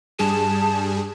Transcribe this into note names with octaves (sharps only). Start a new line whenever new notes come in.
G2 G3 G#4 A5